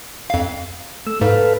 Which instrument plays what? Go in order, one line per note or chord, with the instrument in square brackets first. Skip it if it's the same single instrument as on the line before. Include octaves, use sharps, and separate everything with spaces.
[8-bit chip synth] F2 F5
[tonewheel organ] A3 E6
[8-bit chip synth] G#2 [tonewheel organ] A4 B4 F5